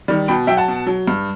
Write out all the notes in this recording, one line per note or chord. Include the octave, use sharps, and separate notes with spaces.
D#3 G3
B2 G5 B5
F#3 E5 G5
F#5 A5
B2
F#3
G2